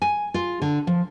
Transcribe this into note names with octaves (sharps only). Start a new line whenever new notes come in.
G#5
F4
D3
F3